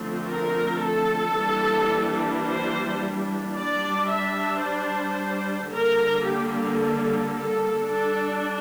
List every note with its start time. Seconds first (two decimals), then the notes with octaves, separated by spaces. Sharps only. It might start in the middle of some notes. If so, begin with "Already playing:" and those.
Already playing: D3 F3 A3 C4
0.29 A#4
0.84 A4
1.38 E3 G3 A#3 D4
2.46 C5
3.54 G3 D4 D5
4.08 E5
4.62 C5
5.70 D3 G3 A#3 A#4
6.25 G4
6.79 A4
7.33 A4
7.87 G3 D4 A4